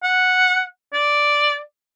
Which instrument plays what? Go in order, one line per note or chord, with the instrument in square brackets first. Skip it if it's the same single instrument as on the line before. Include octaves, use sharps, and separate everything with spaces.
[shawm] F#5
D5